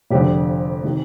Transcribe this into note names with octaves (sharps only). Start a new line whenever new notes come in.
F1 F2 D3 G4
C3 D#3